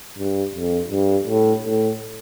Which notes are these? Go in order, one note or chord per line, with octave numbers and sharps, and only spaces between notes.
G2
F2
G2
A2
A2